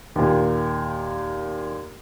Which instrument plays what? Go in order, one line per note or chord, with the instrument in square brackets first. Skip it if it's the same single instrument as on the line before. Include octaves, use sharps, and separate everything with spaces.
[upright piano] D#2 A#2